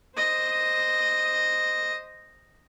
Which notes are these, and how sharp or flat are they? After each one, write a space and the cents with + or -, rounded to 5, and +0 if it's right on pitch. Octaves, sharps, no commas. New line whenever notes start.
C5 -5 D#5 -5